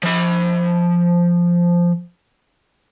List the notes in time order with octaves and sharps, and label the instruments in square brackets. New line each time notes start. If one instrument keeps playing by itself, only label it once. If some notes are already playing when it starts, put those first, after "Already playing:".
[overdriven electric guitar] F3 B5